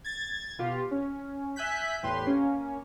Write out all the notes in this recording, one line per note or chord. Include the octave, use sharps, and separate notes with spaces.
G#6 A6
B2 F4 G4
C#4
E5 G#5 F#6 G6 B6
E2 A2 G4 B4 C6
A#3 C#4